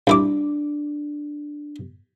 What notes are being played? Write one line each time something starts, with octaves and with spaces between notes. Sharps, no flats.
C2 D4 E4 D6